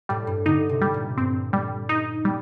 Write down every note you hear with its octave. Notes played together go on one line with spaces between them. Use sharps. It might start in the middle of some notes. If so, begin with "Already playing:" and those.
A2 G3
G2
D3 D#4
C3
G3
A#2
G2 C4
G3
D#4
G3